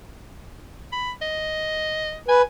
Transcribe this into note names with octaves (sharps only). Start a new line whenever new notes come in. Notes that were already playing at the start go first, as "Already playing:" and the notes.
B5
D#5
B4 G#5